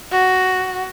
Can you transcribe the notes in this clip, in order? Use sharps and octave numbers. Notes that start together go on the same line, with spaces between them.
F#4